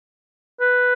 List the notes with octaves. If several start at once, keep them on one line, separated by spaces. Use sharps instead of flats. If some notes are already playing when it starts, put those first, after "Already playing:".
B4